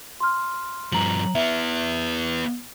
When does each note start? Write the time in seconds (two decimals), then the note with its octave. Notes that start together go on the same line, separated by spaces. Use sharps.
0.20 C6 F6
0.93 G2 F3 A#5 F#7
1.35 B3 E4 E5